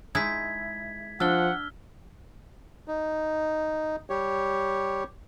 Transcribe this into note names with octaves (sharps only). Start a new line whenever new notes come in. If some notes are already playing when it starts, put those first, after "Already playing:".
G#3 D#4 E4 G#6 B6
F3 D4 F#5 E6 F6 G7
D#4
G3 G4 C#5